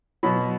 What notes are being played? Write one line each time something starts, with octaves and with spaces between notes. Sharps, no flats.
B2 F#3 B5